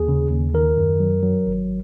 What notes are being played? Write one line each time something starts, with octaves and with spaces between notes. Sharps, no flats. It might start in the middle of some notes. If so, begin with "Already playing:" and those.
Already playing: D#2 G#4
C#3
D#2
D#3 A#4
F#2
F#3
F#3
G#1